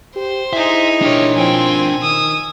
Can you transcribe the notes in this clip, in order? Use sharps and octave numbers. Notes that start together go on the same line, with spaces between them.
G4 C5
D#4 E4 G#4 E5
D4 G4 A#4 C#5
F3 C4 G5 G#5
D#3 D#6 E6